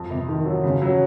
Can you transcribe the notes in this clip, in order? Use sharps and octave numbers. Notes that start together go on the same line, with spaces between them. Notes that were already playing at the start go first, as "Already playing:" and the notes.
Already playing: F2
C3
D#3
F#3
C#3
F#3